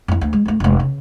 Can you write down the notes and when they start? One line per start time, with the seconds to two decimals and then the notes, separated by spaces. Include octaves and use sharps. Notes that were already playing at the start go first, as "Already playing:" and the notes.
0.08 F2 E4
0.21 D2
0.33 G#3
0.46 F2 A3
0.60 F1 G#2
0.80 C#3